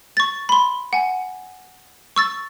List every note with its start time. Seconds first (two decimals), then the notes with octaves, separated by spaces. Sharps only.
0.17 C#6 A6
0.49 B5 C6
0.93 F#5 G#5
2.16 C#6 E6 A6